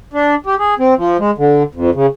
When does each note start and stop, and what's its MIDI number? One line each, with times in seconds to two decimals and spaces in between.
0.13 0.35 62
0.46 0.55 67
0.59 0.74 68
0.79 0.94 60
0.98 1.17 53
1.19 1.31 56
1.38 1.63 50
1.75 1.90 41
1.95 2.06 49